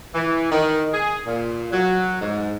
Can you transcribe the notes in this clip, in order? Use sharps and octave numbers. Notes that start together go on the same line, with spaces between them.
E3
D#3
G#4
A#2
F#3
G#2